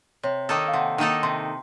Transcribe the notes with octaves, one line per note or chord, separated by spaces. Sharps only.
C3 C#5
D#3 A#3 D#4 A4
F5
C3 F#5
D#3 A#3 D#4 A4
C3 C6